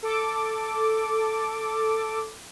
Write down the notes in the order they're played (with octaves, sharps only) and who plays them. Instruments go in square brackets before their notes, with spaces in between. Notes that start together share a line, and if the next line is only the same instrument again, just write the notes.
[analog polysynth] A4 D6